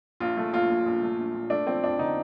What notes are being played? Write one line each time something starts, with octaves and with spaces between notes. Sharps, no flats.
A#1 F4
A3
A#1 F4
A#2
A#1
A3
A#1
A#2
A3 D4
F3 C4
F2 D4
D3 D#4